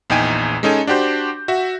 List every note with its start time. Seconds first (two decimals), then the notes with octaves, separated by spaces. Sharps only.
0.10 A#1 E2 D#4 G5 G#5
0.63 G#3 C#4 D#4 A4 G#5
0.87 D4 F#4 G4 C5 G6
1.48 F#4 E5